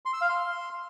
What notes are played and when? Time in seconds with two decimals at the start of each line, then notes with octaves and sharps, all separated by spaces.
0.05 C6
0.13 E6
0.21 F5
0.29 C6